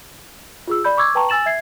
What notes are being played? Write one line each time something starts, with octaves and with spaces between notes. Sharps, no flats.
F4 G#4 E6
D5 B5 G6
C#6 D6 E6 G#6
B4 G5 A5 A#5 C#6
G#5 E6 A6 E7 F#7
E5 G#6 C7